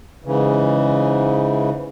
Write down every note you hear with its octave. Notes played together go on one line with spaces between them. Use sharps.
G#2 C#3 E3